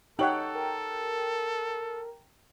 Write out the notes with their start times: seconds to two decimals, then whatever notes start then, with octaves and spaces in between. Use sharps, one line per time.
0.19 D#4 G4 A4 C#5 F#5 G5 F#7
0.55 A#4